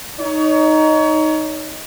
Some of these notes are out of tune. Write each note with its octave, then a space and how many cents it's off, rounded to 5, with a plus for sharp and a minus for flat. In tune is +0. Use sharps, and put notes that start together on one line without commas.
D#4 +0 C#5 +30